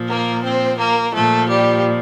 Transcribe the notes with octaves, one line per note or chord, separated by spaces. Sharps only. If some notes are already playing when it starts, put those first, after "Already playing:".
Already playing: A#2 F3
A#3 A#4
C4 C5
A#3 A#4
A#2 F3 A3 A4
G3 G4